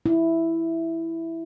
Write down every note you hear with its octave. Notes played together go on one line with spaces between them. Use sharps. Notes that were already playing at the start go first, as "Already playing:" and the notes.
E4